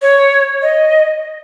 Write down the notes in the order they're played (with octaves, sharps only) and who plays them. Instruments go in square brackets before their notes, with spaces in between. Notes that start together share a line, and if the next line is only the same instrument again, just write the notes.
[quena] C#5
D#5